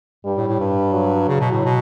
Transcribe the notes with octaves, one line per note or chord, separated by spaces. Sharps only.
G2 G3
A2
A2
G2
F#3
C#3
B2
A2
B2